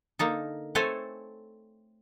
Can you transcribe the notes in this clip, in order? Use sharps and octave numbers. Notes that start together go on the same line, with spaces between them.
D3 A#3 D#4 A4
A3 C4 A4 C5 C#5 G#5